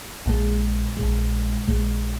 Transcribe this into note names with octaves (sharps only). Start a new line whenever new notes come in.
A#1 A#2 G#3
A#1 A#2 G#3
A#1 A#2 G#3